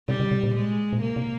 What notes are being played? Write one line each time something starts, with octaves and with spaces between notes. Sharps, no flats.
C3 G3
C#3
C3
A#2
G#3
A#2
C3 A#3
C3